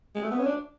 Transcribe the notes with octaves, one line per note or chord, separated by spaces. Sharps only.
G#3
A3
B3
C#4
D4